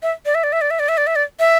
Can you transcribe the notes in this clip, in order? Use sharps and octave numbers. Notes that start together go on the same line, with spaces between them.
E5
D5
E5
D5
E5
D5
E5
D5
E5
D5
E5
D5
E5